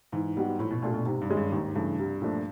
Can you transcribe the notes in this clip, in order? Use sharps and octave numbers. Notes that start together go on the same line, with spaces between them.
G#2 E3
G3 B3 D#4 F#4
A2 F3
B2
A#2 A3 D4 F4 A4
B2
G#2 C3
G2
D#3 G#3 C#4
G2
D#2 G#2
G2 C#3 E3 A3
C2
A#2 F3 A3 D4